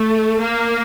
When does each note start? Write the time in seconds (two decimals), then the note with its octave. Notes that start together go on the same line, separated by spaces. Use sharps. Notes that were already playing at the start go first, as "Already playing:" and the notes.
Already playing: A3
0.40 A#3